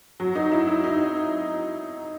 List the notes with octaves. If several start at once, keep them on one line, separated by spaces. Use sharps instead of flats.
F#3
D#4
E4
E4
D#4